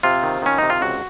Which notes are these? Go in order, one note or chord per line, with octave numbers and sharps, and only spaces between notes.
C3 F4
D#3
D#3 C#4
C3 D#4
F4
C#2 F#4